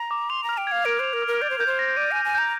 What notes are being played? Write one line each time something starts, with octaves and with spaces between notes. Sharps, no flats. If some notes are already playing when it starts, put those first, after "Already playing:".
Already playing: A#5
D6
C6 F7
A#5
F6
G5
F5 G#6
A#4 D7
C5 F7
A#4
F6
A#4
D5 G6
C5
A#4 G6
C5
A#6
D5 D#7
G#5
G6
G#5
A#5 G6